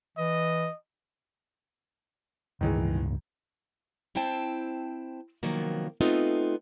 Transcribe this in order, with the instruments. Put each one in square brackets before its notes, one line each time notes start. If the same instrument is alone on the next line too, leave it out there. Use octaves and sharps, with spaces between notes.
[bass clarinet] E3 [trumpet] D#5
[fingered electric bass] C#2 G2 [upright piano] D#3 E3 G#3
[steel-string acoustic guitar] C4 E4 C5 G5 A5
C3 D#3 F3 F#3 A#3 B3
A3 B3 C4 D#4 F4 A4